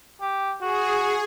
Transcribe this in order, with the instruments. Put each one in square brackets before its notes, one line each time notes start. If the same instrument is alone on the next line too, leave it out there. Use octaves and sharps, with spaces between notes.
[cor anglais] G4
[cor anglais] F#4 [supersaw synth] G#4